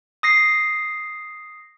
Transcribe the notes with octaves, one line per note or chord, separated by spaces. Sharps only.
D#6 A#6 C7